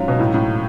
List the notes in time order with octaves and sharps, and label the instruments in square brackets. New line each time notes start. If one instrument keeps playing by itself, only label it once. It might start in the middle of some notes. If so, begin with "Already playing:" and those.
Already playing: [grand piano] G#2 F#3 C#4 F4
[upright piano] B2
A2
A2